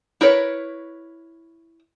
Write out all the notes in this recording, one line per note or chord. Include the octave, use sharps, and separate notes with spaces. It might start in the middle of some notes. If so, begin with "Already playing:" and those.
E4 A#4 B4 C#5